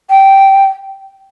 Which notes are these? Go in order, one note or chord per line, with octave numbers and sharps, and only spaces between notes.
G5